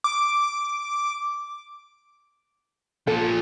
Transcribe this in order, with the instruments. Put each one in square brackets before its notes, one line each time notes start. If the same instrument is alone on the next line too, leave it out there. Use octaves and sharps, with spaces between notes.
[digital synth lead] D6
[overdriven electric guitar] A#2 F3 [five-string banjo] A4